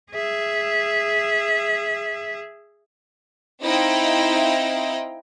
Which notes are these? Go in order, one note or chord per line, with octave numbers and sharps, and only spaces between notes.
G#4 E5
C4 D#4 E4 D#5 F5 G5